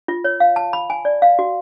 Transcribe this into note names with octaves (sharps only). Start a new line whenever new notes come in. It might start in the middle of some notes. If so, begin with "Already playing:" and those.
F4
C#5
F5
A5
B5
G#5
D5
F5
F#4